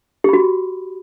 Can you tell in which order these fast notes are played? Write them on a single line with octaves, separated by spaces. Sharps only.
G4 B5 F#4